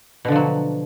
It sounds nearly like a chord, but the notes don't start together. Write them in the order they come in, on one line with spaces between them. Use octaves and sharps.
B2 D3 F3 F#3